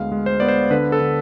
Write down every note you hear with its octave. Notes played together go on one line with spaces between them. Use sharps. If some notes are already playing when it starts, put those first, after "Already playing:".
Already playing: D2 G#3 B3 F5
G#3
C5
B3 D5
C5
D3 B4
A4
D3